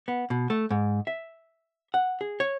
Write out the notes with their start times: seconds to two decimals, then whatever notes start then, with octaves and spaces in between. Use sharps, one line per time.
0.08 B3
0.30 B2
0.50 A3
0.71 G#2
1.07 E5
1.94 F#5
2.21 G#4
2.40 C#5